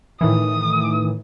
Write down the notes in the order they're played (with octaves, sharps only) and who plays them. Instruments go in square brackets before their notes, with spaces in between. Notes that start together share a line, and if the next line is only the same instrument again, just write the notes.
[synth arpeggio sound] A2 D#3 E3 [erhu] D#6